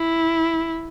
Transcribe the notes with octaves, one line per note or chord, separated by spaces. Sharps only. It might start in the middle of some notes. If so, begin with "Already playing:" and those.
Already playing: E4